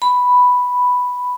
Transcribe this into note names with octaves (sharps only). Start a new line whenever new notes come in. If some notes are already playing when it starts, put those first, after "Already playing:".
B5